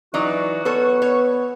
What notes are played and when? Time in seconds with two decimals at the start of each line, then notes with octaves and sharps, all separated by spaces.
0.14 E3 F#3 D#4 F#4 D5
0.65 B3 A4 B4 C#5
1.02 C#5